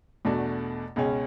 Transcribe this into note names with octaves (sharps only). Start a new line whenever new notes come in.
E2 B2 A3 D4 F#4
C#2 B2 G#3 C#4